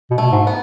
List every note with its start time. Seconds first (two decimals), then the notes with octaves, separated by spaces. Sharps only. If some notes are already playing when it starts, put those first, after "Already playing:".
0.11 B2
0.18 A3
0.32 G#2
0.47 B3